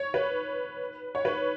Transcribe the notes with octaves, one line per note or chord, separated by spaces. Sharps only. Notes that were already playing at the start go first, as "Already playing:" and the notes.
Already playing: C#5
B4
C#5
B4